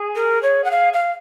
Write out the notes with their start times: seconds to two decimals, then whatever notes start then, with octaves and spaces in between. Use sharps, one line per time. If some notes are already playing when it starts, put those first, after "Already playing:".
Already playing: G#4
0.15 A#4
0.42 C#5
0.64 F#5
0.71 F5
0.93 F5